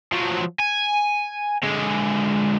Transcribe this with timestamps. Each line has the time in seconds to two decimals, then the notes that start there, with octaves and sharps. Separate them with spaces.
0.12 F3 F#3
0.60 G#5
1.63 D3 G#3